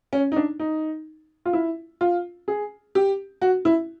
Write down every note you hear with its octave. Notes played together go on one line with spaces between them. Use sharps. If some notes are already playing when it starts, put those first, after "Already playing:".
C#4
D#4
D4
D#4
F4
E4
F4
G#4
G4
F#4
E4